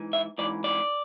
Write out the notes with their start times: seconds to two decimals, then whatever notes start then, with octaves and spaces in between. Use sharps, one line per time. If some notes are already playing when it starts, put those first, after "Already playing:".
Already playing: G#2 E3
0.13 E5
0.38 G#2 E3 D5
0.64 D5